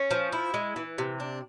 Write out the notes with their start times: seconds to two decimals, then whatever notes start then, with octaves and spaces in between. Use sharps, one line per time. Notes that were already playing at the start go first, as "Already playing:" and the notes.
Already playing: C#4
0.11 F3
0.32 E4
0.54 G#3
0.76 E3
0.98 C3
1.20 D4